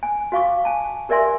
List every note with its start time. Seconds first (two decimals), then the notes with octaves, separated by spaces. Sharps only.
0.03 G#5
0.32 F#4 F5 C#6 D6
0.65 G#5 A5
1.09 G4 A#4 D5 E5 G#5 C6